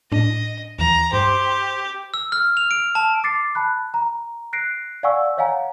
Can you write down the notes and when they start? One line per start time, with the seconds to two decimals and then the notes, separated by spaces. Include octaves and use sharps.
0.12 A2 D4 D#5
0.79 D#2 E3 A#5
1.13 G2 G4 C5
2.14 E6
2.32 F6
2.57 F7
2.71 D7
2.95 A5
3.24 D6 A6 C7 C#7
3.55 A5 B5 F#6
3.94 A#5
4.53 F#6 A#6 C7 D7
5.03 D5 F5 F#5 G#5 C#6 E6
5.37 C#5 D#5 F5 F#5 G#5 A#5